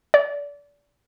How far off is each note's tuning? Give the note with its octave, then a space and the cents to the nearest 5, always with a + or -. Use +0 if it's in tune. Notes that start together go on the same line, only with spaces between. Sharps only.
D5 -25